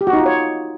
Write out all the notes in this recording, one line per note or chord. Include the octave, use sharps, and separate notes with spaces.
G4
F#4
D#4
F4
C#5